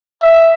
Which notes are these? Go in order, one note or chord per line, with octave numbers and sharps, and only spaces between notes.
E5